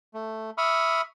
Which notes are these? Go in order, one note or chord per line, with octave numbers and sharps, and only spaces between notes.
A3
E5 B5 C#6 D#6 F6